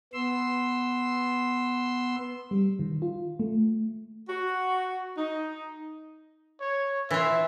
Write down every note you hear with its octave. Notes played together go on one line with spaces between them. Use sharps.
B3 C6 E6
G3
D#3
F4
A3
F#4
D#4
C#5
E3 F4 E5